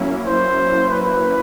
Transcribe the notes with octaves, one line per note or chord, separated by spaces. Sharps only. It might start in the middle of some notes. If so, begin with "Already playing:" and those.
Already playing: F#3 A#3 C#4 E4
C5
B4